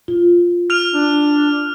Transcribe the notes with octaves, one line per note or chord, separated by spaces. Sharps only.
F4
F6 F7
D4